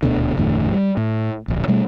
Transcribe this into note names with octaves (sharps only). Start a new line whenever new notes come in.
D#1 D2 B2 D3
F#1 E2 A2 D3
G3
A2
D1 A#1
B2 G3 A3